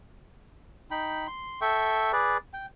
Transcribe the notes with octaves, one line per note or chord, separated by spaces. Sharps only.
D#4 G5 B5
C6
A4 E5 G5 C#6
G#4 B4 D5
G5